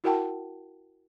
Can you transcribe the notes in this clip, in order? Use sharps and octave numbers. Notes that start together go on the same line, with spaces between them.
E4 F#4 A#4 F#5 G5 A5